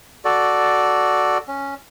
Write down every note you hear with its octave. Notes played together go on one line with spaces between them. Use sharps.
F#4 A4 D5
C#4